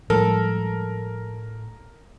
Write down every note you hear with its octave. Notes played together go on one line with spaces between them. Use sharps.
A2 F3 G3 G#3 A4 A#4